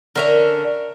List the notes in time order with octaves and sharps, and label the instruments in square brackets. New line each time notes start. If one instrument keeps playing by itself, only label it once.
[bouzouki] D3 C#4 [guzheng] A#4 E5 A#5